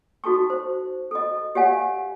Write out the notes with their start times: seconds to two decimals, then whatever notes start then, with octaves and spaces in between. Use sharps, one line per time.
0.24 D#4 F#4 A4 A5 C#6
0.50 C5
1.11 A4 D#5
1.55 G4 C#5 D5 F5 F#5 G#5